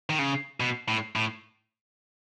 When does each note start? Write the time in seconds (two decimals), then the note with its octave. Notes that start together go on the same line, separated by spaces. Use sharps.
0.10 D#3
0.19 C#3
0.60 B2
0.88 A2
1.16 A2